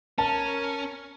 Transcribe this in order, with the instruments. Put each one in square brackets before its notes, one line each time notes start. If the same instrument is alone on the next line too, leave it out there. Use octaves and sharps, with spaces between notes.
[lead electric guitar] C#4 [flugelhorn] A#4 [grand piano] A5